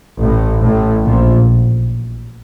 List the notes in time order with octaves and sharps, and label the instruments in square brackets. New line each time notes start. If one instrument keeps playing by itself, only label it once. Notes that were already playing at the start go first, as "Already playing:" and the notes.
[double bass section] A1 A2
A1 A2
A#1 A#2